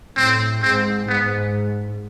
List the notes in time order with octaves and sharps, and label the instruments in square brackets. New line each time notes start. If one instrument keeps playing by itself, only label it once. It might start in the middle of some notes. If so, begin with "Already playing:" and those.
[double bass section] A2 [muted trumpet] C4
[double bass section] G#2 [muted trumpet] C4
[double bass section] G#2 [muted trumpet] B3